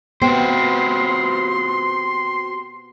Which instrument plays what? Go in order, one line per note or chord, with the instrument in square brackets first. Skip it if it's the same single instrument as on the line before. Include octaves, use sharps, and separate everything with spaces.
[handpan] B3 [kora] C4 [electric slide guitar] F#4 G4 C5 [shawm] C6